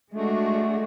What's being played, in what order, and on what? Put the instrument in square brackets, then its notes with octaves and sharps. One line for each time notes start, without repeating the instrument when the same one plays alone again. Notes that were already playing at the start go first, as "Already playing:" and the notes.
[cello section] G#3 D4 F#4 [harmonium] A3